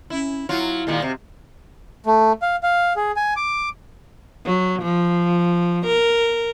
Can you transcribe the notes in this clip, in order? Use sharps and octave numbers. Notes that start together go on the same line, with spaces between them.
C#4 E4
F#3 E4 F4
A#2 D#3 G#3
C3
A3
F5
F5
G#4
G#5
D6
F#3
F3
A#4